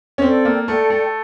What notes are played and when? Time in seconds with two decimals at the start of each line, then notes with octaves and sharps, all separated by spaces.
0.18 C#4
0.22 C4 A4 D5 G5
0.45 A#3
0.68 A3 A4 D5 G5
0.90 A3